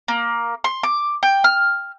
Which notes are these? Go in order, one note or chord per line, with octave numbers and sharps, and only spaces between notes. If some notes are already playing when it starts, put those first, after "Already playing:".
A#3
C6
D6
G5
F6